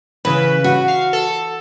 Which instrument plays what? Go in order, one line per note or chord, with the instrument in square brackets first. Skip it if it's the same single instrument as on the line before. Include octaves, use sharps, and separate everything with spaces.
[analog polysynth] C#3 B4 [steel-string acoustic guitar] E3
[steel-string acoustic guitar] F#4
[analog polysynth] F5
A4